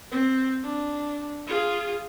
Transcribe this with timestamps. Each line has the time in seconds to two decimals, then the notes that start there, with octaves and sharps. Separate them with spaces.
0.12 C4
0.64 D4
1.47 F4 G#4